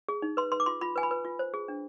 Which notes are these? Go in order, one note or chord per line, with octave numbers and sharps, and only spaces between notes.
G#4
D#4
B4 C6
B4 C6
D6
F4 C6
F4 B5
B4 G#5
B5
B4
F4
C5
G#4
D4